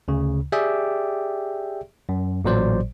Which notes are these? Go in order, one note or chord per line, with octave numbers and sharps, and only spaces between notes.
D2 C#3
G4 G#4 D5 E5 G5
F#2
A1 A#2 F#3 C5 D5